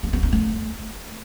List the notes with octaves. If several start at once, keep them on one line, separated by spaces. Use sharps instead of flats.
A#3
B3
D#4
A3